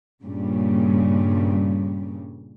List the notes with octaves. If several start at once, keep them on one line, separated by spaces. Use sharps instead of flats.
G2 A#2 C#3 G3